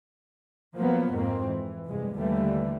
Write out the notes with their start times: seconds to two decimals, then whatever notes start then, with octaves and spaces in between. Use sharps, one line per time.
0.76 F3 F#3 A#3 B3
1.15 F2 G#2 A#3 C4
1.47 E3
1.88 F1 G2 G#3
2.18 D#2 D3 E3 G3 A3